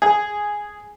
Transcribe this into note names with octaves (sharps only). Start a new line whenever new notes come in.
G#4